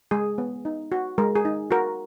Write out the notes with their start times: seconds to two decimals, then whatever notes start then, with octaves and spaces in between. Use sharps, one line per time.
0.11 G#3 G#4
0.38 B3
0.65 D#4
0.92 F#4
1.18 G#3 A#4
1.35 G#4
1.45 D#4
1.71 F#4 A#4